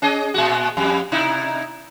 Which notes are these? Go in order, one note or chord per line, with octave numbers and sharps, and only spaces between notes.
C#4 G#4 D#5
A#2 G#3 F#4
F2 G3
C3 D#4 E4